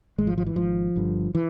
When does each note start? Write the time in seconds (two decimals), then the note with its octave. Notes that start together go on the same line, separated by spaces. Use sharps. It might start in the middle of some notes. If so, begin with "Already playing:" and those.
0.18 G#1 G#2 G#3
0.27 F3
0.38 F3
0.47 E3
0.56 G#1 G#2 F3
0.96 G1 G2 D3
1.35 E3